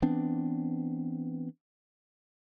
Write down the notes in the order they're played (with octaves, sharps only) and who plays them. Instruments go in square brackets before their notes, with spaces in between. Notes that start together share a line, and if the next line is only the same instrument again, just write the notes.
[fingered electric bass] E3 B3 C4 D4